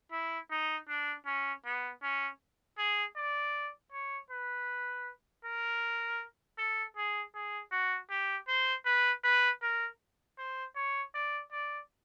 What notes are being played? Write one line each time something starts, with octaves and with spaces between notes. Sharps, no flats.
E4
D#4
D4
C#4
B3
C#4
G#4
D5
C#5
B4
A#4
A4
G#4
G#4
F#4
G4
C5
B4
B4
A#4
C5
C#5
D5
D5